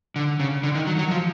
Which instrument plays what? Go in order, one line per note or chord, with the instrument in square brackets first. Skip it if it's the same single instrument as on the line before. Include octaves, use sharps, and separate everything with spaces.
[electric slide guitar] D3
C#3
D3
D#3
F#3
F#3
F3